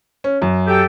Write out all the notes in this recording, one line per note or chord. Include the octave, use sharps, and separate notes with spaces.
C#4
F#2
G4 A4 G5